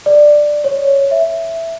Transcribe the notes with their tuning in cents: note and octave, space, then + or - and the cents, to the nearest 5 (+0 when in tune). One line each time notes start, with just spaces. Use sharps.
D5 +10
C#5 -5
E5 +5